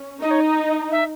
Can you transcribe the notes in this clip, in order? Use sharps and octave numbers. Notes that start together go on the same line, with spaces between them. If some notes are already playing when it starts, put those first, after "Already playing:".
Already playing: C#4
D#4 D#5
C#5
D#5
E5